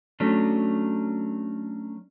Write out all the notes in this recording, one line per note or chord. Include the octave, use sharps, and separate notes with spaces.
F#3 A3 C#4 D4